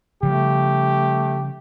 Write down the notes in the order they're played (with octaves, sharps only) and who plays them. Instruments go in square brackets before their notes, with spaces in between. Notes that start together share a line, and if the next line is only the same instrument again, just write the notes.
[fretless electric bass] C#3 F3 G3 [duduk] A3 [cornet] G4